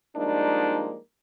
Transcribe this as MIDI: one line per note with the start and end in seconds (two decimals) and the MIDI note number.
0.16 0.97 53
0.16 0.97 55
0.16 0.97 56
0.16 0.97 58
0.16 0.97 62
0.16 0.97 63